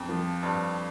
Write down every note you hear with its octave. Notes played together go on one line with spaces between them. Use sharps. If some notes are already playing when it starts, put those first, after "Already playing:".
Already playing: F2
F3
G2